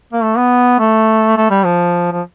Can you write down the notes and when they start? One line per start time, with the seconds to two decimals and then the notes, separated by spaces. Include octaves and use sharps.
0.13 A#3
0.23 A3
0.37 B3
0.79 A3
1.37 A3
1.50 G3
1.65 F3
2.12 F3